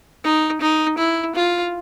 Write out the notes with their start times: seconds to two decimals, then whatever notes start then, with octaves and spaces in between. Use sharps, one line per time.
0.24 D#4
0.61 D#4
0.98 E4
1.35 F4